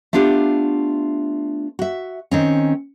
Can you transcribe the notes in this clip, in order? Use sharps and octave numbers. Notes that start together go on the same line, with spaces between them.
A3 B3 D4 F4 G4
F#4 E5
D#3 C4 C#4